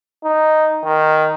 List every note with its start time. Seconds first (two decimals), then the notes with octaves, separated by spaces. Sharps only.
0.25 D#4
0.85 D#3